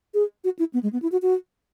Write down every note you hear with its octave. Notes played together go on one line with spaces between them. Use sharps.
G#4
F#4
E4
B3
G#3
B3
E4
F#4
F#4